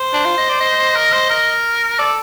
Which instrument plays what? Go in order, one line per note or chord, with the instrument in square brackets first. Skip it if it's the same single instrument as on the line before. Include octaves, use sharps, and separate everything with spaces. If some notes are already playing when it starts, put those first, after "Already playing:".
Already playing: [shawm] C5
[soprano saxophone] D4
F4
D#5
D5
D#5
[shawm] A#4
C5
A#4
[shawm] A4 [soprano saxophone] D5